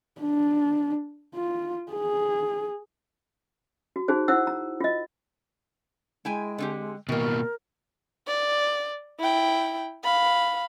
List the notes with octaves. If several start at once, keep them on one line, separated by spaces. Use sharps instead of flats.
D4
F4
G#4
F#4
D#4 F#4 G#4 C5
E4 C5 F#5 E6
A#5
F4 D#5
G#3 E4 G5 G#5
D3 C4 G4
B2 D#3 G3 A#3 A#4
D5
E4 G5
F5 B5